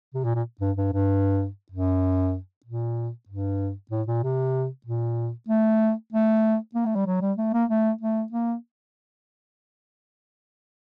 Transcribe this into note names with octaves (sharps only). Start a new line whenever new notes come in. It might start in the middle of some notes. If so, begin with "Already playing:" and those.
C3
A#2
A#2
G2
G2
G2
F#2
A#2
G2
A2
A#2
C3
A#2
A3
A3
A#3
A3
G3
F#3
G3
A3
A#3
A3
A3
A#3